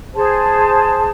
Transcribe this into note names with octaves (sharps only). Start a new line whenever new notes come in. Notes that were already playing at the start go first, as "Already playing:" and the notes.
G#4 C5 A5